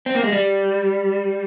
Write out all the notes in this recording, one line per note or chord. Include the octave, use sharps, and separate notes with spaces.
C4
A#3
G#3
G3